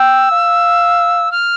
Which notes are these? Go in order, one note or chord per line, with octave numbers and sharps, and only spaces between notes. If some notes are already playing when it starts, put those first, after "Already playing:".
Already playing: G5 E6
F5
F6